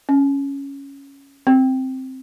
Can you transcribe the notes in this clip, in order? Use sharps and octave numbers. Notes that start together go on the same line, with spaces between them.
C#4
C4